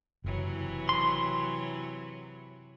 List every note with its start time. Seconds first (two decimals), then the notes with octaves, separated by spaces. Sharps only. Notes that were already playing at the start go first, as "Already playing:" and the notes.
0.24 F#1 C3 E3 F#3
0.89 C6